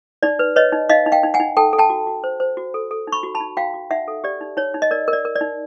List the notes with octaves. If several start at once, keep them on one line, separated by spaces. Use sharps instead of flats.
D#4 D5
B4
B4 C#5 D#5
D#4
D#4 D#5 F5
D#4
F5 G5
D#4
F#5 G#5
D#4
A4 G5 A5
A4
G5 A5
F#4
F#4
C5
C5
F#4
A4
A4
D#4
B5 C#6
F#4
A5 B5
D#4
F#4 F5 G5
F#4
D#4 E5 F#5
A4
G4 D5
D#4
D#4 C#5
D#4
D#5
A#4 D5
A#4
D5
A#4
D5
D#4